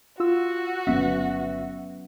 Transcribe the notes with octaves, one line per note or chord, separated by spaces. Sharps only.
F4 F#4 E6
G1 F#3 B3 C#4 E5